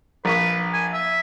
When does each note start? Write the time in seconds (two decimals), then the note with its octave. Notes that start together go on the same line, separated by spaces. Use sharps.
0.25 A#1 B4 C#6
0.73 G#5
0.93 E5